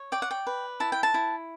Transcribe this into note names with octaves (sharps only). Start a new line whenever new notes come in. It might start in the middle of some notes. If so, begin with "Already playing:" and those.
Already playing: C#5
D5 G5
F#5
G5
B4
E4 A5
G5
A5
E4